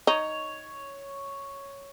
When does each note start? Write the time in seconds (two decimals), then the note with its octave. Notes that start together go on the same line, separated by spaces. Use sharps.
0.07 D#4 C#5